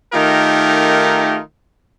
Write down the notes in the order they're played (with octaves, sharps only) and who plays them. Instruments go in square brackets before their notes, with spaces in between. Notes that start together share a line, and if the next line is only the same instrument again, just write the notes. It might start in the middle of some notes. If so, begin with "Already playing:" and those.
[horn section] D#3 A3 D#4 F4 G4 A#4